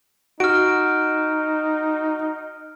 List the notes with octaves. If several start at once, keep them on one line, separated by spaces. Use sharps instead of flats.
D#4 F#4 F6 D7